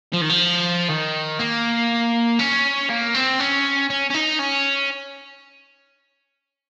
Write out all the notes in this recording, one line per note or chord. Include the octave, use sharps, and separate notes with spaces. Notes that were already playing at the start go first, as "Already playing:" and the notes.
F3
D#3
F3
D#3
A#3
C#4
A#3
C4
C#4
C#4
C#4
D#4
C#4